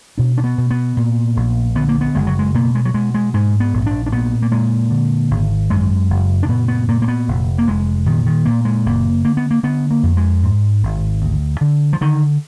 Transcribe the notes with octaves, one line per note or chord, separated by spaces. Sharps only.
B2 D4
D4
B3
B2
B3
A#2
A#1
D3 B3
A#3
B3
F#1 G#3
F#3
G#3
B2 A#3
G#3
F#3
B2 G#3
G#3
G#2 G#3
B3
A#1
D4
D4
A#2 B3
A#3
A#2 G#3
D3
G#1
F#2 G#3
F#1
D4
A#2 B3
B3
A#2 A#3
A#3
B3
F1
A#3
F1 G#3
A#2 D#3
D#3
A#2 A#3
G#3
F#1 A#3
D3 A#3
B3
A#3
D3 B3
A#3
F2
G#3
G#2
G#1
D2
D3
F3
D3 D#3